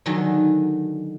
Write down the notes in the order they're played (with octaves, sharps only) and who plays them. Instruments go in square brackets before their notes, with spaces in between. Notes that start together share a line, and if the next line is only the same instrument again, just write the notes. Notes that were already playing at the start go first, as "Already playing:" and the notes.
[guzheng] D3 D#3 F#3 D#4 G#4